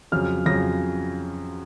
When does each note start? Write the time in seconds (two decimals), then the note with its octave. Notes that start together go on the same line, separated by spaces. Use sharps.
0.12 F2 C#3 F#3 F6
0.46 F2 C#3 F#3 A#6